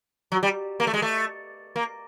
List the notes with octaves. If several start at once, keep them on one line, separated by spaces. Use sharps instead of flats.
F#3
G3
A#3
A3
G#3
A3
A#3